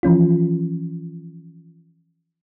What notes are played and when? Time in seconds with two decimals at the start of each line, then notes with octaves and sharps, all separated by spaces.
0.03 E3 F3 C#4 F4